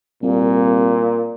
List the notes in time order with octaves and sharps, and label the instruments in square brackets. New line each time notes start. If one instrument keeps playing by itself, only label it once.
[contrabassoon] C2 [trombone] A#2